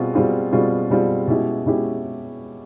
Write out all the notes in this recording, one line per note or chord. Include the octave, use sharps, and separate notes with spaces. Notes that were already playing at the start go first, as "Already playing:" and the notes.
Already playing: B2 G3 C4 F4 G#4
B2 G3 C4 F4 G#4
B2 G3 C4 F4 G#4
B2 G3 C4 F4 G#4
B2 G#3 C#4 E4 G4
B2 G#3 C#4 E4 G4